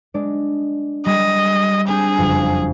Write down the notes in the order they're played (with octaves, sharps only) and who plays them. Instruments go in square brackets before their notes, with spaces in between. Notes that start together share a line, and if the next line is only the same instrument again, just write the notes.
[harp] G#3 D4 D5
[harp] G3 [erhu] D#5
[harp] C4 D4 G6 [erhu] G#4
[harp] F#1 F2